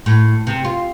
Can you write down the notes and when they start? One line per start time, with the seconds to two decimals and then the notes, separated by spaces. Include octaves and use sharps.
0.06 A2
0.47 C3
0.65 F4